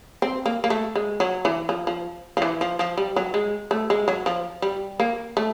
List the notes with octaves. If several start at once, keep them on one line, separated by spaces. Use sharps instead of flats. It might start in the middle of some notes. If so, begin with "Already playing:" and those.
C4
A#3
A#3
A3
G#3
F#3
E3
F3
F3
F3
E3
F3
F3
G3
F#3
G#3
A3
G#3
F#3
F3
G3
A#3
A3